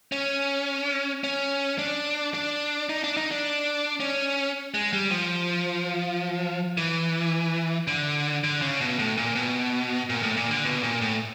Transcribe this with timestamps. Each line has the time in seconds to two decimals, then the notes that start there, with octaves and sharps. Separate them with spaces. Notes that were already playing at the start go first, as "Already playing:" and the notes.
0.12 C#4
1.24 C#4
1.79 D4
2.34 D4
2.89 D#4
3.04 D4
3.17 D#4
3.31 D4
4.00 C#4
4.74 G#3
4.93 G3
5.10 F3
6.77 E3
7.87 D3
8.44 D3
8.62 C#3
8.81 B2
8.99 A2
9.17 A#2
9.35 B2
10.10 A#2
10.23 A2
10.37 A#2
10.51 D3
10.64 B2
10.83 A#2
11.01 A2